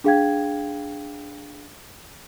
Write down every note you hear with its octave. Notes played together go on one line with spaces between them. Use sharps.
D4 G#4 F5 G5 G#6